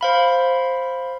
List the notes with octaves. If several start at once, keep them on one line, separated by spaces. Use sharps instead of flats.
C5 F5 B5